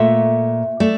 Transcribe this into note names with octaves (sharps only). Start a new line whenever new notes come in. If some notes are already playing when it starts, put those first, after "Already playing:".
Already playing: A#2 A3 E5
A3 D5